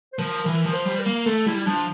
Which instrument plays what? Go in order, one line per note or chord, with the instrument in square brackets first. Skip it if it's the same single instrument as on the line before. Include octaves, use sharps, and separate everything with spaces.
[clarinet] C5
[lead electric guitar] F3 [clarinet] A#4
[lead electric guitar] E3 [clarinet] A#4
[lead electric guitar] F3
[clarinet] C5
[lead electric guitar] G3
[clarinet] A#4
[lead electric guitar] A#3
[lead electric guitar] A3 [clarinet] A4
[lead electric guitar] G3 [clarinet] E4
[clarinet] E4
[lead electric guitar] F3 [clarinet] D4